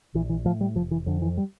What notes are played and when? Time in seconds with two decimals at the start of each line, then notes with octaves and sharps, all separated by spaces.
0.15 A#1 E3
0.29 E3
0.45 A2 F3
0.61 G3
0.75 F1 F3
0.91 E3
1.06 F2 D3
1.22 E3
1.37 G3